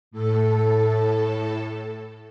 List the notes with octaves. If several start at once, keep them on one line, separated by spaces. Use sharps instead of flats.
A2 A4